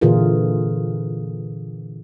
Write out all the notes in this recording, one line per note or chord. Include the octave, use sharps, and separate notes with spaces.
A#2 D3 E3 F4 G#4 A#4